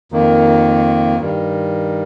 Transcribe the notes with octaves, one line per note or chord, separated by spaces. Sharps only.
F2 D#3 A#3
G2 D#3 G3